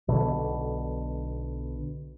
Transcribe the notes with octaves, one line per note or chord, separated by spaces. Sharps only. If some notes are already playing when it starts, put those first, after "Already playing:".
B1 B2 D3